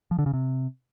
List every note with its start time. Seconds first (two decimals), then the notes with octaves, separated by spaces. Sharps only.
0.11 F3
0.19 D3
0.26 C#3
0.33 C3